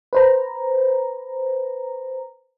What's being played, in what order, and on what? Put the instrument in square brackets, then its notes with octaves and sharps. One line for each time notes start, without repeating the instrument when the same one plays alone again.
[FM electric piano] B4 C5 A#5